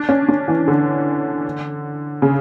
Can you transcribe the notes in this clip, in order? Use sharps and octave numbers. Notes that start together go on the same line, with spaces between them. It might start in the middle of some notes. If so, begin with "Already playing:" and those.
Already playing: D4
C#4
D4
E3
D3
C#3